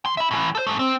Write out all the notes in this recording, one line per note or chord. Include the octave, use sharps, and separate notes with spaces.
E3 C6
E5 B5
A2 E3
A4 C5
G#2 A3
C4